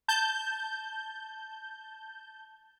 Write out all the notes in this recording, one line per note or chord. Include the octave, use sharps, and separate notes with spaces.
A5 G6